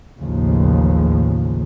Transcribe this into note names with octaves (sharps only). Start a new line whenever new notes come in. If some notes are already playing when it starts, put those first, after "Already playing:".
A1 D#2 C#3 F3